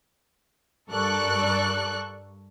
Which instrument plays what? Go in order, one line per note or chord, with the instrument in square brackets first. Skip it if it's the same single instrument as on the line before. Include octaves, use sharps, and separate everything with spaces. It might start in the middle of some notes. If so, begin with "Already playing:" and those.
[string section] G2 A4 A#4 D5 C#6 F#6